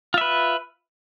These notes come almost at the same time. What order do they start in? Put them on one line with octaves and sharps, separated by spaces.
F4 E5 B4